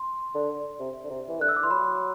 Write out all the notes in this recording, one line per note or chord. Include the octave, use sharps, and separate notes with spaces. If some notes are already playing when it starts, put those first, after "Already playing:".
Already playing: C6
D3
C3
D3
C3
E3
D3 F#6
E6
D6
E3 C6
F#3 B5